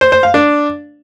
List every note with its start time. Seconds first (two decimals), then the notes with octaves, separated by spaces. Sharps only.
0.01 C5
0.12 C5
0.23 F5
0.34 D4